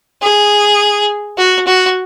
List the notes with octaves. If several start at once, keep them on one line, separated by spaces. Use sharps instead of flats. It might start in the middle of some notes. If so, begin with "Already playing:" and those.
G#4
F#4
F#4